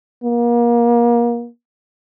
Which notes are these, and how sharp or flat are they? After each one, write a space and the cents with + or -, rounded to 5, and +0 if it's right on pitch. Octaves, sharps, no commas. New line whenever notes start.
A#3 +30